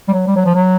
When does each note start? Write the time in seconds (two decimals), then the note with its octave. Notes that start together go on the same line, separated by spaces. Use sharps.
0.08 G3
0.13 F#3
0.27 G3
0.36 F#3
0.46 F3
0.55 F#3